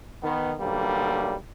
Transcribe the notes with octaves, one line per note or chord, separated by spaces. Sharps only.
D#3 B3
B1 D3 G3 A#3